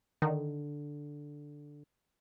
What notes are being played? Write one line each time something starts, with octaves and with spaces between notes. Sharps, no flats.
D3 D#3